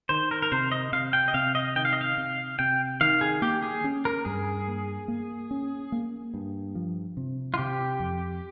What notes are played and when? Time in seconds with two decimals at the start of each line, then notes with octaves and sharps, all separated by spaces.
0.09 D#3 C5
0.31 A#4
0.42 A#4
0.52 C3 C5
0.72 D#5
0.92 C3 F5
1.13 G5
1.28 D#5
1.34 C3 F5
1.55 D#5
1.76 D#3 G5
1.85 F5
1.93 D#5
2.01 F5
2.18 C3
2.59 C3 G5
3.01 D#3 F5
3.21 G#4
3.42 A#3 G4
3.63 G#4
3.84 C#4
4.05 A#4
4.25 G2 G#4
4.68 A#3
5.08 A#3
5.51 C#4
5.92 A#3
6.34 G2
6.75 F3
7.17 C3
7.54 F4
7.58 C3 G4
8.00 F2